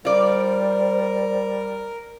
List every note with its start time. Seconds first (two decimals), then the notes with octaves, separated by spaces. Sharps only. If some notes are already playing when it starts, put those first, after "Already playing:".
0.05 G3 F4 A#4 C5 D5